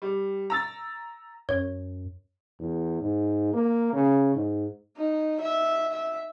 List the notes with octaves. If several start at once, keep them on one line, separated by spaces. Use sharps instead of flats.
G3
A#5 E6 A6
F#2 C#5
E2
G#2
A#3
C#3
G#2
D#4
E5
E5